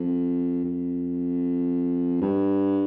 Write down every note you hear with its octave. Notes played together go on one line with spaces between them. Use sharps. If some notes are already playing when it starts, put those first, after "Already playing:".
Already playing: F2
F2
G2